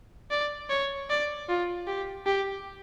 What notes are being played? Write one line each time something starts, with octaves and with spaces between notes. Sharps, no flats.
D5
C#5
D5
F4
G4
G4